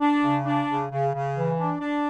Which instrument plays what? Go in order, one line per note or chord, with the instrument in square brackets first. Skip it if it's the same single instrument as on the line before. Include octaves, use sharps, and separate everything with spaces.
[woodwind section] D4
C#3
D4
C#3
C#3
C#3
E3
D4
D4